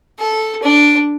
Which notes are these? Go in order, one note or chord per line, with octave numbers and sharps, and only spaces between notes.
A4
D4